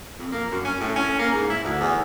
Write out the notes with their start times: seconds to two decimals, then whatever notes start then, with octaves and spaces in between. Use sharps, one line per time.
0.19 F2
0.32 A#3
0.51 F#2
0.65 C#4
0.80 A2
0.96 C#4
1.19 A#3
1.32 G#2
1.50 E4
1.64 D2
1.80 E2